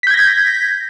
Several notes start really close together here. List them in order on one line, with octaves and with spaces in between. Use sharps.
B6 G6 G#6 A#6